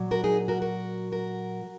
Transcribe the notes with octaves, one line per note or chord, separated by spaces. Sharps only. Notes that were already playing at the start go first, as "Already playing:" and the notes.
Already playing: A#2 F#3
F#4 A#4
D#4 G#4
F#4 A#4
F#4 A#4
F#4 A#4